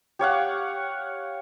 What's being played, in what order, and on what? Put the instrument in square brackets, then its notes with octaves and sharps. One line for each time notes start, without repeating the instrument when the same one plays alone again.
[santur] G4 C#5 F5 F#5